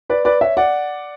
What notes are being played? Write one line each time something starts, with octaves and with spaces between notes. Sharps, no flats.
B4 D5
B4 D5
C#5 E5
D5 F#5